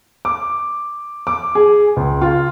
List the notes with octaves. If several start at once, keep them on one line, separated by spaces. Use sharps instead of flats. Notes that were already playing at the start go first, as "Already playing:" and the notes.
D6
D6
G#4
C#2
F4